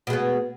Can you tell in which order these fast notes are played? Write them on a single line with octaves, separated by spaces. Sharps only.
B2 G#3 B3